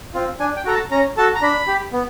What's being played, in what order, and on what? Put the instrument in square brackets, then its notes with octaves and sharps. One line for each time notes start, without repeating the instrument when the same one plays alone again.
[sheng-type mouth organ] C4 F4
D4 G#5
G5
F#4 A4 A#5
A5
C#4 A#5
F#4 A4 A5
A#5
D4 B5
G4
B3